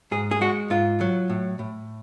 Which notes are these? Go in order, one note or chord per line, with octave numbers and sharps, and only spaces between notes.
G#2 G#4
G#4
G#3 F#4
G#2 F4
F#3
A2
A2